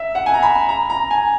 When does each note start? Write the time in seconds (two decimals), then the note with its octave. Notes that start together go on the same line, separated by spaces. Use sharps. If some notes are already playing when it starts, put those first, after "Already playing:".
Already playing: E5
0.15 F#5
0.26 G#5
0.34 A#5
0.43 B5
0.69 A#5
0.90 A#5
1.11 G#5